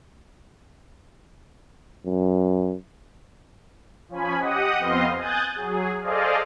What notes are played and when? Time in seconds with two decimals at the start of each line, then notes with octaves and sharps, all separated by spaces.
2.06 F#2
4.09 F3 C#4 G#5 B5
4.38 G4 D#5 F#5 D#6
4.79 F2 B3 C4 D#5 F5 C6
5.17 G#5 D#6 F#6 G6 A6
5.56 F#3 G#4
6.01 G#4 A4 C5 D5 D#5 F5